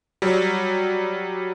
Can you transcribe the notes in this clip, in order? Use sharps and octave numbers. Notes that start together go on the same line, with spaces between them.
F#3 G3